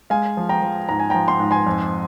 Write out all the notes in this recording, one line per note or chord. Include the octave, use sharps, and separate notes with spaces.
G#3 F5 G#5
F3
G5 A#5
F3
G#2 A#5
G#5
F3 G5 A#5
C6
G#2
G#5 C6
F2